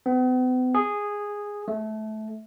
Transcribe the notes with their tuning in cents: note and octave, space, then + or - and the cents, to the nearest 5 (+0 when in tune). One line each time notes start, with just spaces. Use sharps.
B3 +45
G#4 -10
A3 -20